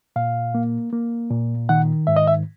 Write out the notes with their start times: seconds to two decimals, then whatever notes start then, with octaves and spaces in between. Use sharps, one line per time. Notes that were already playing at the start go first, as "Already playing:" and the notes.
0.16 A#2 F5
0.55 A#3
0.93 A#3
1.31 A#2
1.69 D#3 F#5
2.07 G#2 E5
2.16 D#5
2.27 E5